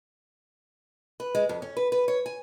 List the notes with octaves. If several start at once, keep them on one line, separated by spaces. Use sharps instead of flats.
B4
G#3
F2
C#4
B4
B4
C#5
G#5